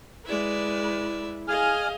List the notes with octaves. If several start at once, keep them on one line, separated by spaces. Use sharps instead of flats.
G#3 E4 B4 D5 E5
G#4 D#5 F5 G#5 F6